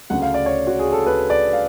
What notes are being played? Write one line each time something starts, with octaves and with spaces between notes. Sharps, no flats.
D2 C#3 F#5
F5
D5
C#5
F#4
G#4
A4
B4
D5
F5